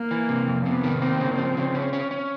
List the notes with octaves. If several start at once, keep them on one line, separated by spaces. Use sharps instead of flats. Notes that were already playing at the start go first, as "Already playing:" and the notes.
Already playing: A#3
E3
C3
F2
C3 B3
D#3
A#3 C4
C#3
F3
C#3
C#4
C#4
C#4